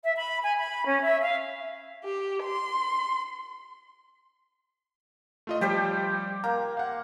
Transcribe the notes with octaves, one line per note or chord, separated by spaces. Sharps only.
E5
B5
G#5
B5
C#4
E5
F5
G4
C6
A3 F4 D#5
F3 G3 G4 C5 G5
A#3 A#5
F5 F#5